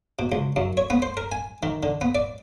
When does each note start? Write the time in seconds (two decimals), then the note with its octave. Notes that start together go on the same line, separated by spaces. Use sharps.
0.19 B2
0.32 C#2
0.56 F#2
0.77 C#5
0.90 B3
1.02 C5
1.17 A#4
1.32 G#5
1.63 D#3
1.83 D3
2.01 B3
2.15 D5